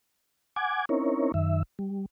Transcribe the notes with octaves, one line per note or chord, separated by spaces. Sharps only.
F#5 G#5 D6 G#6
C4 C#4 D#4 E4 A#4 C#5
F#2 D#3 E5
G3